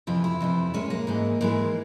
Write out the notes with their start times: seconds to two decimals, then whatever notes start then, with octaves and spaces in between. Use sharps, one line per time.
0.07 F2 C3 E3 F4
0.24 E4
0.41 F2 C3 E3
0.74 A#2 G#3 C#4
0.90 A#3
1.07 G#2 E3 G#3
1.41 G#2 E3 G#3 A#3